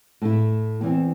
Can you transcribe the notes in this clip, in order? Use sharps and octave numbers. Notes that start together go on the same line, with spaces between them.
A2 A3 E4
E2 E3 C4